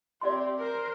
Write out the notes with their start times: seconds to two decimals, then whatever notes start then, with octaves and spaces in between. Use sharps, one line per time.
0.21 C4 G4 D5 E5 C6
0.58 A#4 C5